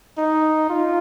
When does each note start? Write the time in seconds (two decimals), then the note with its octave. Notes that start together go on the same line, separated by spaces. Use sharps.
0.18 D#4
0.70 F4